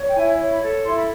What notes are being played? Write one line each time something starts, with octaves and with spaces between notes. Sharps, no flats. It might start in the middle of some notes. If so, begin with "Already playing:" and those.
Already playing: C#5
G5
E4 G#5
C#5
B5
A4
E4 C6
B5